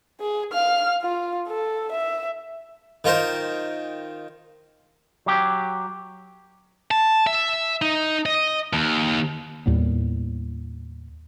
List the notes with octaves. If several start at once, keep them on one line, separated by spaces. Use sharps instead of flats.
G#4
F5 F6
F4
A4
E5
D#3 F4 A#4 C5
F#3 G4
A5
E5
D#4
D#5
D#2
D#2 A2 G3 B3